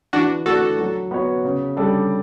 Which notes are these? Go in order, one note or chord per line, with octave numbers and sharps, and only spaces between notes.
E3 D4 F#4
A3 D4 F#4 A4
F#3
B3 F#4 C#5
C#3
G3 D4 A4 D5